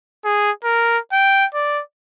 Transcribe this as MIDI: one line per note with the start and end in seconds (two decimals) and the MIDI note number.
0.25 0.51 68
0.64 0.99 70
1.12 1.46 79
1.54 1.82 74